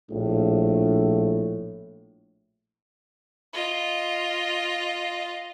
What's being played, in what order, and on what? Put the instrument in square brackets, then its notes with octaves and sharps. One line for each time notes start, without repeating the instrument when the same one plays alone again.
[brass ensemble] A#1 A2
[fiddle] F4 D#5